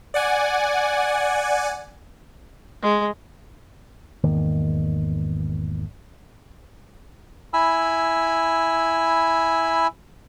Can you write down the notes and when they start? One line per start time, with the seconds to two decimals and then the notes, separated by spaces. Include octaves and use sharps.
0.14 D5 F#5 G#5
2.82 G#3
4.23 G#1 E2 D#3 A#3
7.54 E4 G#5 B5 E6